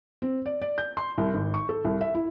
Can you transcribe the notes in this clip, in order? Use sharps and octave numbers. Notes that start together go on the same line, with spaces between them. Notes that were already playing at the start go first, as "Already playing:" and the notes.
C4
D5
D5
G6
C6
C2
G#1
C#6
A4
C2
E5
E4